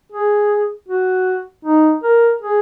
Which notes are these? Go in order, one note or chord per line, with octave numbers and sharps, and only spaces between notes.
G#4
F#4
D#4
A#4
G#4